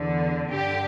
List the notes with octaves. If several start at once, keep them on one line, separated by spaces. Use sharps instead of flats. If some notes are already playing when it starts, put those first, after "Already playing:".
Already playing: E2 D3
G2 D3 G4